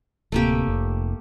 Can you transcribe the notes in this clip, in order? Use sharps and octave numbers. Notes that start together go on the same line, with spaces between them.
D1 C3 A3 A#3 G4
F1